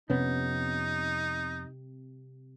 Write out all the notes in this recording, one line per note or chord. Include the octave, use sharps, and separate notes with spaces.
F2 C3 B3 C#4 D#4